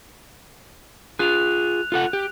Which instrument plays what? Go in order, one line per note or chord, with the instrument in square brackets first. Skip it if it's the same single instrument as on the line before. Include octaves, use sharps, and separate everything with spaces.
[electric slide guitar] F4 G#4 [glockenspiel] F#6 F7
[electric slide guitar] F4 A4 F#5
G4